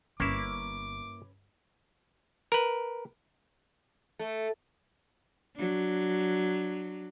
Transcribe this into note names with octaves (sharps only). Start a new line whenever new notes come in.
G1 A#3 C#4 E4 B4 D6
A#4 B4
A3
F#3 D4